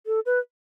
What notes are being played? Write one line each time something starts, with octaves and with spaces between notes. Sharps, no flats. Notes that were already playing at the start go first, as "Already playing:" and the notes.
A4
B4